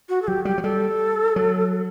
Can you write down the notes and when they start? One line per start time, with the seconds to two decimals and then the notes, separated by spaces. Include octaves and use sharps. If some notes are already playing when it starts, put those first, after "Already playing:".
0.09 F#4
0.22 A4
0.27 F#3 G4
0.45 G3 G4
0.58 F#3
0.63 G3 A4
1.36 F#3